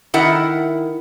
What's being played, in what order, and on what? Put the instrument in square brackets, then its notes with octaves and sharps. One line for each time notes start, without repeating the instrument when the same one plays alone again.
[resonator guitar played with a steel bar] D#3 E4 A#4 F#5